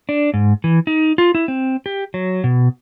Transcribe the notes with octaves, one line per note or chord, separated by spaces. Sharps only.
D4
G#2
E3
D#4
F4
E4
C4
G4
F#3
B2